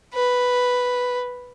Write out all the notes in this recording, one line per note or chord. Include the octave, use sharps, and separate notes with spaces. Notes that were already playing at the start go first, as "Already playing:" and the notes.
B4